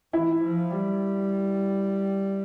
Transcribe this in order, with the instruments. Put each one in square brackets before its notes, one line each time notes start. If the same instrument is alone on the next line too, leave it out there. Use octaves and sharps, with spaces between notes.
[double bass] E3 [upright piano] E4
[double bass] F3
G3